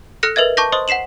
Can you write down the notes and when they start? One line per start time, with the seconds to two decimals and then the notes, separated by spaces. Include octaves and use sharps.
0.23 A4 F6 F#6 A#6 C#7
0.36 A#4 B4 D#5 E5 G#6
0.57 A5 C#6 D6 G6 A#6
0.72 C5 D#5 C6 D#6
0.88 F#5 B6 C7 E7 F#7